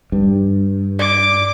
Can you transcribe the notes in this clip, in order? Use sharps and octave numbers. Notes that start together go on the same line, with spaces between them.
G2
D5 D6